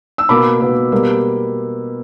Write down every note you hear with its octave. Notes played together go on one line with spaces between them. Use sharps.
E6
B2 A#3 B5 D6
B2 A#3
B2 G3 A#3